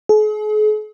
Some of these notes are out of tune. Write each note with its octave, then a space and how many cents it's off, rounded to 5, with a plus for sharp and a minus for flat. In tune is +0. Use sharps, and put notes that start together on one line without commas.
G#4 +45